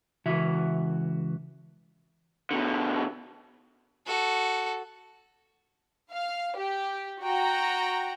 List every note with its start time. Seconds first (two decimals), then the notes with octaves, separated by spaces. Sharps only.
0.26 C#2 E3 F#4 E5
2.51 B2 D3
4.06 F#4 A4
6.12 F5
6.57 G4
7.22 F#4 G5 A#5